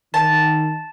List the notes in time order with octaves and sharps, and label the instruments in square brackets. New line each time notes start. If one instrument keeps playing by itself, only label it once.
[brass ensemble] D#3 [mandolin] A5